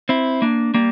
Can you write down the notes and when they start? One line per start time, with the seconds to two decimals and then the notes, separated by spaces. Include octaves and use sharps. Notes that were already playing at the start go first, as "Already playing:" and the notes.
0.09 C4 E4
0.42 A#3 D4
0.74 G3 A#3